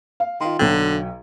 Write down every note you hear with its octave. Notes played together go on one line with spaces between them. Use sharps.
F5
D#3 F4 C6
B1 D3 F#3 G5